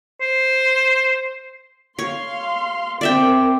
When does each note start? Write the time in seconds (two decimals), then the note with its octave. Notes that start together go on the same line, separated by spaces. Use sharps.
0.21 C5
1.99 C#5 F5 C6
3.01 C4 A#4 D5 E5 G5